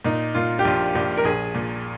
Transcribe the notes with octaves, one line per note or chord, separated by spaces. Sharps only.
A#2 D#4
A#2 F4
G4
A#1 F4
A#1 G4
A#4
A#1 G#4
A#2